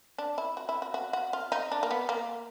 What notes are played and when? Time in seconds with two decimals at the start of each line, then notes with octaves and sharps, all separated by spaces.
0.18 D4
0.38 E4
0.57 F#4
0.69 E4
0.82 F#4
0.94 F#4
1.13 F#4
1.33 F4
1.52 D#4
1.72 D4
1.83 A#3
1.91 B3
2.09 A#3